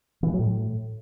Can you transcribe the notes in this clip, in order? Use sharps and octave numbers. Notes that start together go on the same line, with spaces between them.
E3
G#3
F#3
A2